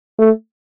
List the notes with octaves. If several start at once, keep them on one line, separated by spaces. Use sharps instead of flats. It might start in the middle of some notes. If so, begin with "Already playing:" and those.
A3